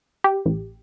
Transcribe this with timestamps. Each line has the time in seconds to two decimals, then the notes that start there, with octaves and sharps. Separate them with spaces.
0.24 G4
0.46 A1